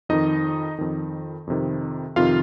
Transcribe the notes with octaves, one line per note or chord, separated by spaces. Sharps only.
F2 D#3 D#4 D#5
F2 D#3
F2 C3 D#3
F2 C3 D#3 F4 F5